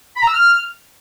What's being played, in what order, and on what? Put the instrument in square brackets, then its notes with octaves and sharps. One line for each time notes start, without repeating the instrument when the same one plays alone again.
[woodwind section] B5
A#5
E6
F6